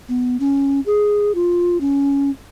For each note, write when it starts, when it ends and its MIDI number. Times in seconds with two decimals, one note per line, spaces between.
0.09 0.37 59
0.40 0.80 61
0.86 1.34 68
1.35 1.80 65
1.81 2.30 61